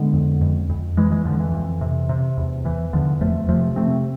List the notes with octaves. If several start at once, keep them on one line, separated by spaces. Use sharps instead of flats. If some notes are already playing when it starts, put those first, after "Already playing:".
Already playing: D3 G#3 B3
F2
F2
F2
F2 E3 G#3
E3 G#3
F2 D3 F3
E3
F2
C3
C3
E2
E2 E3
E2 D3 F3
F2 F3 A3
C3 F3 A3
C3 A3 C4